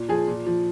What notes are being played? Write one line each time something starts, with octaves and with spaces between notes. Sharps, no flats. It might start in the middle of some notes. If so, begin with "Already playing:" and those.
Already playing: A#2
F3 G#4
A#2
F3